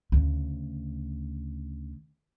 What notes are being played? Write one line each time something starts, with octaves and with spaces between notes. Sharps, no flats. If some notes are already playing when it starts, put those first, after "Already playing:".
D2 C#3